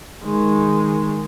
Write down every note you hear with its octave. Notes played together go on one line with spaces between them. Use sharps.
D#3 G#3